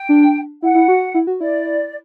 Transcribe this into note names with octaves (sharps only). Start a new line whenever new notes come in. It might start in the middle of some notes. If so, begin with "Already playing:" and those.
Already playing: G5
D4
E4 F#5
E4
F#4
E4
F#4
E4 D5